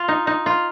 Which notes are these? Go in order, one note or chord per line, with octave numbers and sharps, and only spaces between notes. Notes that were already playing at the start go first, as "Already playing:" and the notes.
Already playing: F4
D#4
D#4
F4